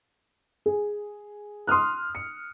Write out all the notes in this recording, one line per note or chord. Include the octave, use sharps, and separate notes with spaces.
G#4
C6 D#6 F6 F#6
C#7